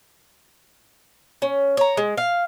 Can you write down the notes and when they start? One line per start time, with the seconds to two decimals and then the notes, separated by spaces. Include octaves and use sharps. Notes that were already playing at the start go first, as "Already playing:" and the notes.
1.42 C#4
1.77 C#5 A#5
1.97 G#3
2.17 F5